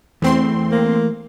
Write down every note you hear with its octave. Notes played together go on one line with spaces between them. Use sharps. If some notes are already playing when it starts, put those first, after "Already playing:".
E2 E3 A3 C4 C6
A#3